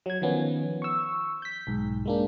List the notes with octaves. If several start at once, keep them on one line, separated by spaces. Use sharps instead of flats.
F#3 G#6
D#3 F3 B3 C#4
C#6 E6
G6 B6
B1 G#2
G#3 A#3 D4